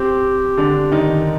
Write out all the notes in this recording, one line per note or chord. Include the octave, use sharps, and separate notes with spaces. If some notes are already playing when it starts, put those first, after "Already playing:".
Already playing: C4 G4
D3 D4
D#3 D#4